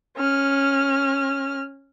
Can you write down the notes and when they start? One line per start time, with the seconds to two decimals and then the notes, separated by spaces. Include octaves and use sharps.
0.17 C#4 F6